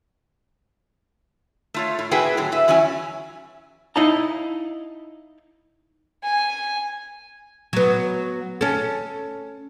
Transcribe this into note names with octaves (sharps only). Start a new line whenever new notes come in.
A3 F4 C#5
A2
B3 E4 F#4 G#4 B4 G5
A2 D3 F#3
B4 E5
E2 F#3 C#4 E4 G#5
D#4 E4 D#5 F5 A5 A#5
G#5
F#3 B3
C#4 A4